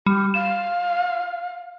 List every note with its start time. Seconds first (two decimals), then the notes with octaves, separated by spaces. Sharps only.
0.06 G3 G4
0.34 F5 E7